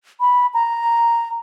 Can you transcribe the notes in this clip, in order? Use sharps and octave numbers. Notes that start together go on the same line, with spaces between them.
B5
A#5